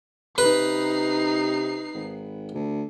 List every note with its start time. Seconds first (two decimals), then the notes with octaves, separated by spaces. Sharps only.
0.38 C3 D#4 B4 C7
1.94 G#1
2.54 D2